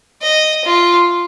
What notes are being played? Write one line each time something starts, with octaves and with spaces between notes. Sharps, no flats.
D#5
F4